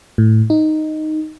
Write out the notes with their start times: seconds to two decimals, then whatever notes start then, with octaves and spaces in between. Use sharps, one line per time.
0.18 A2
0.50 D#4